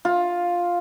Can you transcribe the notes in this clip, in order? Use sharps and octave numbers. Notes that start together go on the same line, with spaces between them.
F4